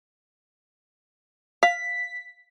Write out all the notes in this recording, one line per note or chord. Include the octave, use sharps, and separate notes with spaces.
F5 B6